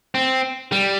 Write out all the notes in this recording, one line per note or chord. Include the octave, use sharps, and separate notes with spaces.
C4
G3